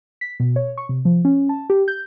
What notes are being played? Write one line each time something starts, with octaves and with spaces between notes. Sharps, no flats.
B6
B2
C#5
C#6
C3
F3
C#4
A5
G4
G6